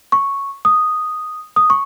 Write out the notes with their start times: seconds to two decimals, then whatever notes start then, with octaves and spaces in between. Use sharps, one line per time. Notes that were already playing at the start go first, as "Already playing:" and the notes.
0.12 C#6
0.65 D#6
1.56 D#6
1.70 C#6